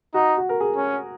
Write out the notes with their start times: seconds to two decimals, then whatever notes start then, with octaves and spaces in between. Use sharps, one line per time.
0.14 D#4 F#4
0.37 F#4
0.49 A#4
0.61 G#4
0.76 C#4